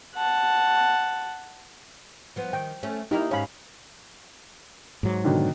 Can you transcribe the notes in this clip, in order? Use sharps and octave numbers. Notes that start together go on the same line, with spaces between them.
F#5 A5
F3 B3
D#3 G5
A3 C#4
A#3 D#4 E4 G4 A#4
G#2 C#4 C#5 F5 B5
G#2 F#3
B2 D3 D#3